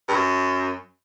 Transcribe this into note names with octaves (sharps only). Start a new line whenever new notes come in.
G2
F#2